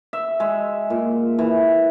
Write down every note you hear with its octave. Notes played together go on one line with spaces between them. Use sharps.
E5
G#3
A#2
E3